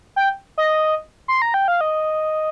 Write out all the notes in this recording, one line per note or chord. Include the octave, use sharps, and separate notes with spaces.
G5
D#5
C6
A#5
G5
F5
D#5